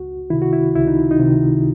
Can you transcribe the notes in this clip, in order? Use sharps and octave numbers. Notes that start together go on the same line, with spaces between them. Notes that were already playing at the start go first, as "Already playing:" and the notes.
Already playing: C#2 F#4
C3 D#3 E4
F#4
E4
C#2 E4
D#4
D#4
C3 D#3